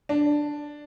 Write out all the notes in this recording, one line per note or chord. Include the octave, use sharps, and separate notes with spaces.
D4